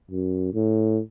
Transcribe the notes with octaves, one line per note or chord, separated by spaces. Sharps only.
F#2
A2